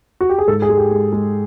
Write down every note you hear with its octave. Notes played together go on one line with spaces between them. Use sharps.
F#4
G4
G#4
G#2 A4
G#4
G#3
G4
G#3
G#3